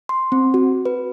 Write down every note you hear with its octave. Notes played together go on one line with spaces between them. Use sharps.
C6
C4
F#4
B4